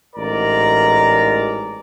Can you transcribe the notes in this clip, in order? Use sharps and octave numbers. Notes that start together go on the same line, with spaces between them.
A1 G#2 A#4 D5 A#5